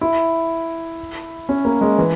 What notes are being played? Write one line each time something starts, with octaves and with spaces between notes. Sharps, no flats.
E4
C#4
A#3
G#3
E3